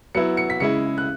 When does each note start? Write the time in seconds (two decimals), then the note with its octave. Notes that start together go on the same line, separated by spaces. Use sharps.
0.15 F#3 B3 E4 C#7
0.37 C#7
0.50 B6
0.60 C#3 G#3 E4 C#7
0.98 F#6